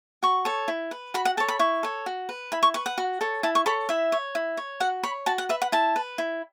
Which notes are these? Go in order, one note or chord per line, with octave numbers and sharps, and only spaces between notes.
F#4 C#6
A4 C#5
E4
B4
F#4 B5
F#5
A4 C#5 A5
B5
E4 C#6
A4 C#5
F#4
B4
E4 B5
C#6
B4 C#6
F#5
F#4
A4 C#5
E4 A5
C#6
A4 C#5 B5
E4 E5
C#5
E4
C#5
F#4 F#5
C#5 B5
F#4 A5
F#5
B4 E5
F#5
E4 A5
B4
E4